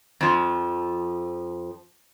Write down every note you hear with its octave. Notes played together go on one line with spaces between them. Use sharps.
F2 F3